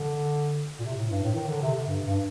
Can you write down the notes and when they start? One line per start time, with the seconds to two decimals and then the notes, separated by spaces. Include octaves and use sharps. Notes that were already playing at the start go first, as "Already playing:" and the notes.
Already playing: D3
0.79 A#2
0.84 C3
0.96 A2
1.10 G2
1.23 A2
1.35 D#3
1.48 D3
1.62 C3
1.75 D3
1.87 G2
2.05 G2